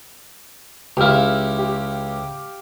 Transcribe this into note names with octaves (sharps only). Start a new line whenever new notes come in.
C#2 E4 G4 F5
G4